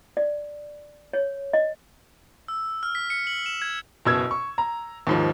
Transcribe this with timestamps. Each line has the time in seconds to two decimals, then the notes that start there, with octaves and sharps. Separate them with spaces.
0.17 D5
1.13 C#5
1.53 D#5
2.48 E6
2.83 F6
2.95 B6
3.10 C#7
3.27 F#7
3.46 E7
3.62 G#6
4.05 F#1 B2 E6 G#6
4.31 C#6
4.58 A#5
5.07 D#2 G#2 F3